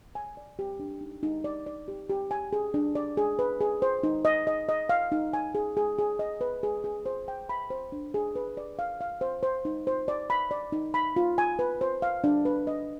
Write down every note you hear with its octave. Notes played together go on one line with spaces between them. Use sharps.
G#5
D5
G4
D4
D#4
D#4
D5
D5
G4
G4
G#5
G#4
D4
D5
G#4
B4
G#4
C5
D#4
D#5
D#5
D#5
F5
D#4
G#5
G#4
G#4
G#4
D#5
B4
G#4
G#4
C5
G5
B5
C5
D4
G#4
B4
D5
F5
F5
C5
C5
D#4
C5
D5
B5
D5
D#4
B5
F4
G#5
B4
C5
F5
D4
B4
D#5